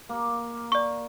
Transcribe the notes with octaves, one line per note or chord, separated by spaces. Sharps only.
A#3
D5 C#6